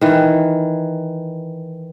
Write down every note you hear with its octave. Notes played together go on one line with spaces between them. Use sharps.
D#3 E3